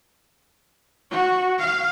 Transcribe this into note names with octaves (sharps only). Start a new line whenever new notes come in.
F#4
F5